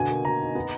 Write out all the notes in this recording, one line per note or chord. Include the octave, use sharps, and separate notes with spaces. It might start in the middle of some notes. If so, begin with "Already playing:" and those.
Already playing: B2 D3 G#5
A#3
B2 A#5
D#4
B3